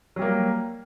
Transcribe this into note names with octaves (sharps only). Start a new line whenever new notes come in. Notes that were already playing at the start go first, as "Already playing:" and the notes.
F#3 G3 A#3